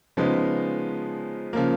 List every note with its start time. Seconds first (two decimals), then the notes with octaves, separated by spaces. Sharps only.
0.17 C#3 F3 G#3 B3 D#4
1.53 C#3 F3 A#3